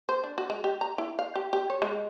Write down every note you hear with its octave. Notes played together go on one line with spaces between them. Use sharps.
C5
D4
F#4
G#3
G4
A#5
E4
F5
G4
G4
C#5
G#3